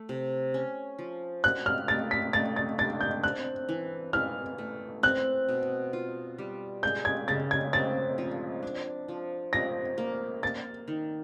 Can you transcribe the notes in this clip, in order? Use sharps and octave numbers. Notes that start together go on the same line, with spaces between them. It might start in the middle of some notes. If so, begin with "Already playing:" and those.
Already playing: A3
C3
C#4
F3
F#4 F#6
F6
A3 A6
B6
A3 A6
A6
D4 A6
G6
C4 F#6
E3
E3 F6
A3
C4 F#6
B2
F4
G3
G#3 G6
G#6
C#3 A6
G#6
C4 A6
F3
D4
F3
F3 A#6
A#3
A#3 A6
D#3